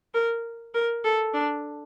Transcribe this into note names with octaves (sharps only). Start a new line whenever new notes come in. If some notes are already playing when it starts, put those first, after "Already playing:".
A#4
A#4
A4
D4